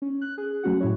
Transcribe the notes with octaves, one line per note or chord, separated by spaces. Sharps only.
C#4
F#6
G#4
F#3 A3 C#4 F#4 F#5
A2 E4 C#5